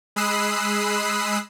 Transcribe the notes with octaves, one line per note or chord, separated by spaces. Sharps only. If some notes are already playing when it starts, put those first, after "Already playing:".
G#3 B5 D#6 E6 F#6 C7